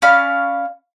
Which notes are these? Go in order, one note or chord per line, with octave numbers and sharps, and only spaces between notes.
C#4 D5 F5 B5